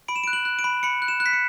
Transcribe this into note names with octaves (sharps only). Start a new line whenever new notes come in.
B5 D7
E7
D7
F#6
F#7
F#6
D7
B5
B5 C#7
F#6
E7
F#6
B6
C#7